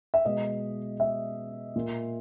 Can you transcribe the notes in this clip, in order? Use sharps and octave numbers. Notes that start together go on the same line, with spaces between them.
E5
B2 G#3 B3 D#5
E5
A#2 A#3